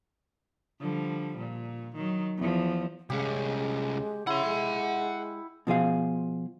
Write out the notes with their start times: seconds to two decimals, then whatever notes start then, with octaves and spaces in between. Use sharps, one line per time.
0.81 D3 F3 G3
1.37 A#2
1.95 D#3 F#3
2.38 E2 F3
3.10 C2 G#3 C#4 G4
4.27 C#3 E4 F#5 C6
4.45 G#3
5.67 B2 F3 G#4 F5